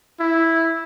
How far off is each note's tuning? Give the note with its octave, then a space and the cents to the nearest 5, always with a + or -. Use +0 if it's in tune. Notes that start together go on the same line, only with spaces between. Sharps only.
E4 -5